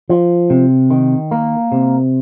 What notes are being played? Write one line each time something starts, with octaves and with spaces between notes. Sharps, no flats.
F3
C3
D#3
A#3
C3